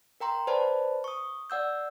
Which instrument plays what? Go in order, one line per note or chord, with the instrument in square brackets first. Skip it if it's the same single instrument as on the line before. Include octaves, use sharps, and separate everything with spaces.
[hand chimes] A#4 G5 A#5 C6
B4 C5 D5 A5 B5
C#6 D#6
D5 F#5 E6 G6